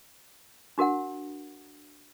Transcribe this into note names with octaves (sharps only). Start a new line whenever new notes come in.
D4 F#4 A#4 F#5